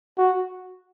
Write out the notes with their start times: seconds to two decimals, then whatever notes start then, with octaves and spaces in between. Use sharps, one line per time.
0.18 F#4